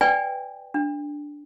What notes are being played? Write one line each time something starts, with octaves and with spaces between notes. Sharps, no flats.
B4 D5 G5 G#5
D4